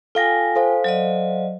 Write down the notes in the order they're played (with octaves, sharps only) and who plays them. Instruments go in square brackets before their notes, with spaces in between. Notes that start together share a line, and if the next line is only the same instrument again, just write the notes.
[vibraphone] F4 G5 G#5 [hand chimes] A4 F5 A#6
[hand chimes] A4 C5 F5
[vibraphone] F#3 D5 D#5